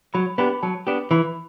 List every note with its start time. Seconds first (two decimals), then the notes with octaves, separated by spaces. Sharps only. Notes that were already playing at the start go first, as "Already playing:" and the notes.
0.14 F#3 B5
0.38 B3 D4 G4 B5
0.63 F#3 A5
0.87 B3 D4 G4
1.11 E3 B5